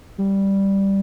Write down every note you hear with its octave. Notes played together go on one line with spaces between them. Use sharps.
G3